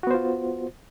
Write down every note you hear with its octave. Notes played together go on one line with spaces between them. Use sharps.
B3 F4 F#4 C5